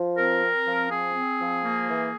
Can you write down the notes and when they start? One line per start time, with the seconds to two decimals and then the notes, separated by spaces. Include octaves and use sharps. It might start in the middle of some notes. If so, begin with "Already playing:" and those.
Already playing: F3
0.18 C4 A#4
0.42 C4
0.66 F3
0.91 C4 G#4
1.14 C4
1.39 F3
1.63 A#3
1.88 E3